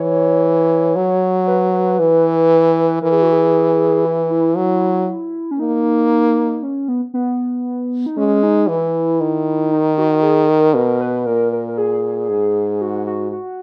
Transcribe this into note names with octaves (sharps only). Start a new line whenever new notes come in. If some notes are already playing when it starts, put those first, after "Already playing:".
Already playing: E3 C#5
F#3
B4
B4
E3
E3 A#4
G#4
F#4
G#4
E4
E4
F#3
C#4
A#3 D#4
C#4
B3
B3
D#4
G#3 C#4
D#4
E3 E4
D#3
D#4
F#4
G#4
A#4
B2 A#4
B4
A#2 A#4
A#4
A#4
G#4
G#2
F#4
F#4
F#4